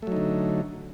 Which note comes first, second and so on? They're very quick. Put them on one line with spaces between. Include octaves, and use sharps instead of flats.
A3 F#3 D#4 D3